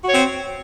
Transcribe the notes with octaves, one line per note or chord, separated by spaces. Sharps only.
C4 F#4 C#5